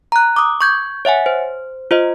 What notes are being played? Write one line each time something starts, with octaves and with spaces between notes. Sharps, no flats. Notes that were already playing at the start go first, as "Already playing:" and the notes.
A#5 F#6
D6 D#6
C#6 G6 G#6
C#5 E5 F#5 G#5
C5
F4 C5 D#5